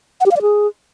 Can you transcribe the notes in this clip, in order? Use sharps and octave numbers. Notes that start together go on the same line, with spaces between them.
F#5
G4
F5
D5
G#4